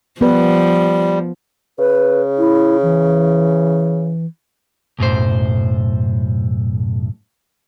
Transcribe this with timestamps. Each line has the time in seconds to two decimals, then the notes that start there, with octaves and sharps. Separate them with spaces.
0.21 F3 G3 B3 B4
1.79 C#3 B4
2.38 E4
2.83 E3
4.99 B1 F#2 A2 C5